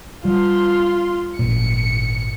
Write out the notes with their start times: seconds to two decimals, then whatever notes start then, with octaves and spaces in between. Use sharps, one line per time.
0.25 G3 F4 C6
1.39 G#1 A#2 C#7